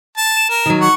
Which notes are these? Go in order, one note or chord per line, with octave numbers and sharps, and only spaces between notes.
A5
E7
A#4
D#3 F#3
F#5 C#6